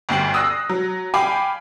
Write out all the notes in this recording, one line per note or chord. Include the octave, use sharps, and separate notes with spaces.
G1 D2 G5 C7 F#7
D#6 E6 F#6 A#6 C7
F#3
F5 G5 G#5 B5 D6